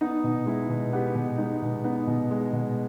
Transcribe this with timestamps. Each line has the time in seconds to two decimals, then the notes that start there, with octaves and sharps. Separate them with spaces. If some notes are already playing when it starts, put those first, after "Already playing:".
0.01 B3 D#4
0.24 B2
0.46 G#3 E4
0.69 B2
0.93 B3 G4
1.15 B2
1.38 G#3 D#4
1.62 B2
1.84 B3 D#4
2.07 B2
2.31 G#3
2.53 B2